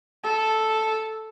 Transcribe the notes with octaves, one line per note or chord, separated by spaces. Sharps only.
A4